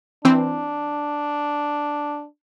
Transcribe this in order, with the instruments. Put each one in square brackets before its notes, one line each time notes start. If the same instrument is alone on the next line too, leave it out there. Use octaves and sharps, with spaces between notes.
[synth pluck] E3 C4 [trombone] D4